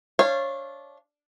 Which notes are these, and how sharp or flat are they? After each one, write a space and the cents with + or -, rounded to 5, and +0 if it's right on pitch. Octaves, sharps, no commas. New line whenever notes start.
D4 -15 C#5 -25 F5 -25